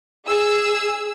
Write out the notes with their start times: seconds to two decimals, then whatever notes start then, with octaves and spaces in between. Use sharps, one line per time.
0.27 G#4 E6